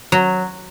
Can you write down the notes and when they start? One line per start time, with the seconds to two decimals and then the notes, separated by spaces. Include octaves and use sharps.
0.12 F#3